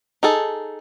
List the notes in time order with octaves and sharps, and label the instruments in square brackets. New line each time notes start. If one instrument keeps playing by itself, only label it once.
[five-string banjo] D#4 G#4 A4